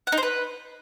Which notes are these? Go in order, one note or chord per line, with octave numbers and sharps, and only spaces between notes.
F#5
D#4
C5
B4